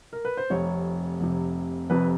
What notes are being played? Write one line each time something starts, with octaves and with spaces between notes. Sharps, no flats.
A#4
B4
C5
F1 F2 C3 C#5
F1 F2 C3
F1 F2 C3 B4